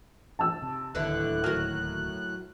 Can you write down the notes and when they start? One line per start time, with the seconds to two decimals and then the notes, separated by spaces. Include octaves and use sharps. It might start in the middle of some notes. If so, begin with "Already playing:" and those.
0.39 A5 E6
0.62 C3
0.95 D1 D#2 A2 D3 B3 E4 F#6
1.44 F#3 A#4 F6